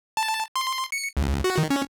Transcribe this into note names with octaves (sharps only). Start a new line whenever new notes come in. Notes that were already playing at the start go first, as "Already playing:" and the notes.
A5
C6
C#7
C#2
F#4
D#3
C#4